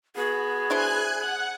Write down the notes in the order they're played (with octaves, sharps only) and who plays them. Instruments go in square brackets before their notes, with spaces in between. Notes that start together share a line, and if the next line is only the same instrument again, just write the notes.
[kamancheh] B3 F#4 [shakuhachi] G#4
[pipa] D4 E4 C5 [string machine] G#5 F#6 G#6
[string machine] F#5 [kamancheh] F#6